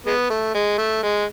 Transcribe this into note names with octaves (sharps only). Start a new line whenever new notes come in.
G#3 B3
A3
G#3
A3
G#3